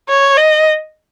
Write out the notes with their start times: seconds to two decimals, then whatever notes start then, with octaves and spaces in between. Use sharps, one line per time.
0.09 C#5
0.37 D#5